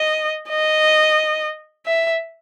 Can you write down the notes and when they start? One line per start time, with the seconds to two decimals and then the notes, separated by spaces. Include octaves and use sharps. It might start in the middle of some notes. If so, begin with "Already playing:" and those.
Already playing: D#5
0.49 D#5
1.86 E5